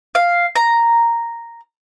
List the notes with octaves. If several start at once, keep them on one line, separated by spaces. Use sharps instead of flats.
F5
A#5